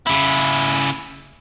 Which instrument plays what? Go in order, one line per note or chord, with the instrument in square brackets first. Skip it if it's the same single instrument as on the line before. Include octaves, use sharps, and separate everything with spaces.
[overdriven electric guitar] C#3 E4